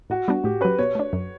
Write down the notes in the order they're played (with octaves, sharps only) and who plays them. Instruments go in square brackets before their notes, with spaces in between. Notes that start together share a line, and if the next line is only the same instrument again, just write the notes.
[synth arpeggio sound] A2 [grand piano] F#4
[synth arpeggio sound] G3 B3 D4
[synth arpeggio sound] A2 [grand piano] G4
[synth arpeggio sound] F#3 C#4 [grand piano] B4
[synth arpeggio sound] B2 [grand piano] C#5
[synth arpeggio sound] A3 D4
F#2